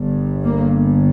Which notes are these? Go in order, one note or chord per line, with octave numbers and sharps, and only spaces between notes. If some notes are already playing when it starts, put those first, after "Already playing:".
Already playing: G1 G2
A#3